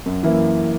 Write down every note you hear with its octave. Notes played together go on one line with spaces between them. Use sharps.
F#2
E3 A#3 E4